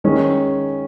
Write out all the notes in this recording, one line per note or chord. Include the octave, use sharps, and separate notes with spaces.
D#3 G#3 C#4